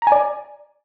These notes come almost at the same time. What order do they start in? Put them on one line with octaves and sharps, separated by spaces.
A#5 G#5 D5